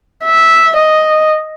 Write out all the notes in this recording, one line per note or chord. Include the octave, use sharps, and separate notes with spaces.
E5
D#5